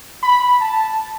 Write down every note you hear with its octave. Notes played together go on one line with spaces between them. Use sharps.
B5
A5